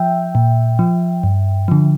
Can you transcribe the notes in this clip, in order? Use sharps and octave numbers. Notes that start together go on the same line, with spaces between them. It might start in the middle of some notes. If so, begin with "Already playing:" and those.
Already playing: F3 E5 G5
A#2
F3
G2
D3 F3